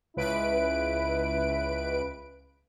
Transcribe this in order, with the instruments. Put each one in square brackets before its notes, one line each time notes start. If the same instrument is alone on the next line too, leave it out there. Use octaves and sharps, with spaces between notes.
[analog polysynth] C#2 B4 D7 [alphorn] E4